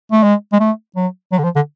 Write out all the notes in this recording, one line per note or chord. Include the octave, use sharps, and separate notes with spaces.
A3
G#3
G#3
A3
F#3
F#3
D3
F3
D3